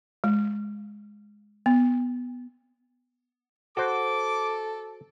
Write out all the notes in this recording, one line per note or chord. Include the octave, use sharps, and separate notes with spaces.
G#3
B3
F#4 A4 C5 D6